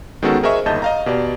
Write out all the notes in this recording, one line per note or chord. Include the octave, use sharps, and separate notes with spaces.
D#3 G#3 B3 C#4 F#4 A4
G#4 A#4 C5 D#5 E5 C#6
G1 D#2 D#5 A5 G6
D#5 F5 A#5
B2 G4 D5